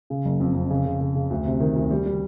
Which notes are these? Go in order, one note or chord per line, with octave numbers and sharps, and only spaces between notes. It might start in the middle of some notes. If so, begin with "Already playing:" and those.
C#3
F#1
F2
F2
C#3
C#3
C#3
C#3
D2
C3
D#3
D2
G3
G3